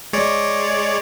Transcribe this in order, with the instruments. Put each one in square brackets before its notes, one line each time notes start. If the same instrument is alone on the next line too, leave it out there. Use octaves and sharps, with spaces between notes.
[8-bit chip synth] G#3 C#5 D5